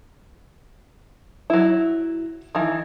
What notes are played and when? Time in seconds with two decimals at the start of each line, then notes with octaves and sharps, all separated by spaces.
1.50 F#3 E4
2.55 D#3 E3